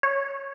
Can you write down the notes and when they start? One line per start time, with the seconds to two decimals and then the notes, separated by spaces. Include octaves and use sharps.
0.03 C#5